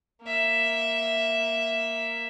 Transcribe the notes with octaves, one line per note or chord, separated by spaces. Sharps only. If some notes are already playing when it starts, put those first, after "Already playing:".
A#3 E5